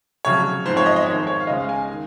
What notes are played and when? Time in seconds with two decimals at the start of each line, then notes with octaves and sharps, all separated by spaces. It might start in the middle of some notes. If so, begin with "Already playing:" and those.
0.25 F1 F2 C#3 F#3 C#5
0.66 G#2 F3 C4 C5
0.77 C#5
0.86 D#5
0.96 D#5
1.07 F2 D#3 G#3 C#5
1.18 C5
1.27 C#5
1.40 F5
1.47 C#2 C#3 G#3 C#4 D#5
1.58 F5
1.69 G#5
1.89 D#3